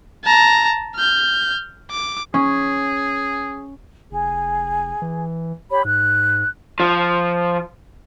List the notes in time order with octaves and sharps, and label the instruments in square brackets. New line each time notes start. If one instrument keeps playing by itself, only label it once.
[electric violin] A5 A#5
F6 G6
D6
[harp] C#4 [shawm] G#4
[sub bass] F1 [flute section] G#4
[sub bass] E3
[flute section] G4 C#5 B5
[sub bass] G#2 [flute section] F#6
[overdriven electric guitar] F3